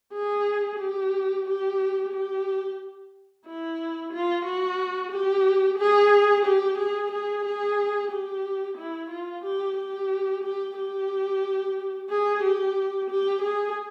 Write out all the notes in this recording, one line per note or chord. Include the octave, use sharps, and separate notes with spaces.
G#4
G4
G4
G4
E4
F4
F#4
G4
G#4
G4
G#4
G#4
G#4
G4
E4
F4
G4
G4
G4
G4
G#4
G4
G4
G#4